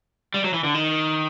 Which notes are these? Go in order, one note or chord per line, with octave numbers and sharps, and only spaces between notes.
G3
F#3
E3
D3
D#3